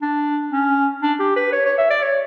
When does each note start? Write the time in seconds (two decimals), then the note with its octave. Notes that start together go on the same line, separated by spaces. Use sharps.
0.02 D4
0.52 C#4
1.02 D4
1.20 G4
1.36 B4
1.53 C#5
1.65 C#5
1.78 E5
1.90 D5
2.03 C#5